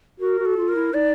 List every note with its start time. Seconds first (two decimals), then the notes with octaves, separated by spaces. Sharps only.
0.20 F#4 A#4
0.39 F#4
0.45 A4
0.57 F4
0.68 A#4
0.75 E4
0.93 D#4 D5